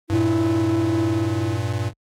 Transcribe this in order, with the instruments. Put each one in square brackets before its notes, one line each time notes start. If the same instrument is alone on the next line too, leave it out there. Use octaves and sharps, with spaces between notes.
[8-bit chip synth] G2 A#2 [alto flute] E4